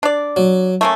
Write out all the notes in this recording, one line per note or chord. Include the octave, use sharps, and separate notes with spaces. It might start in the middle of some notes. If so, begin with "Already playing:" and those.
D4 D5
F#3
A3 A#3 C#4